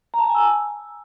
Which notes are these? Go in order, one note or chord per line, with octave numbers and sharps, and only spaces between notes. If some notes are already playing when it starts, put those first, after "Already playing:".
A#5
A5
A#5
G#5
E6